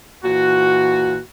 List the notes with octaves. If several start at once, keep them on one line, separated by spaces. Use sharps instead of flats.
A#2 E3 F#4